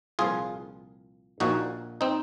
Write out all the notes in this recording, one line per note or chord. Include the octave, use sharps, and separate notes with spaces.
C2 A#2 F3 F4 G#4
A#1 A#2 F3 D#4 F#4
C4 D#4